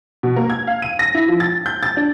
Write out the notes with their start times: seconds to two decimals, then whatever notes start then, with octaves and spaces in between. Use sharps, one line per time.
0.23 B2
0.36 A#3
0.50 G#6
0.67 F5
0.82 D#7
0.99 A#6
1.15 E4
1.28 F3
1.40 A6
1.66 G6
1.83 A6
1.97 D4